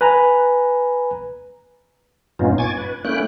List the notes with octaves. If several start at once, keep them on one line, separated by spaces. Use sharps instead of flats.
B4 G#5 A#5
G2 A#2 B3 C#4 D#4 F4
G#5 C#6 D6 G#6 A6
B4
A3 A#3 C#4 E4 G5 F#6